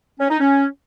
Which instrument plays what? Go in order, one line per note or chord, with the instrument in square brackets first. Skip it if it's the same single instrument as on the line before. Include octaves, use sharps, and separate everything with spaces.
[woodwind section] C#4
D#4
C#4